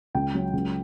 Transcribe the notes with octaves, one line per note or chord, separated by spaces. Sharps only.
C#2 G5
F#3
C#2